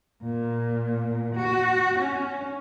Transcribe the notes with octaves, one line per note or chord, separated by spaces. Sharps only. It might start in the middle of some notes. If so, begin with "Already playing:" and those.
A#2
F#4
C#4